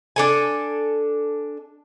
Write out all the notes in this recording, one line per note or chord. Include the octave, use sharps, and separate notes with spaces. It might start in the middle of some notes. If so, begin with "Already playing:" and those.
D4 A4 G#5